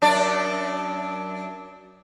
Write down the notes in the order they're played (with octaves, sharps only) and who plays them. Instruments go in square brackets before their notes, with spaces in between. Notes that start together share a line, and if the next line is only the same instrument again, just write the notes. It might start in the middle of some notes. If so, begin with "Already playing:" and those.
[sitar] F#2 D4 D5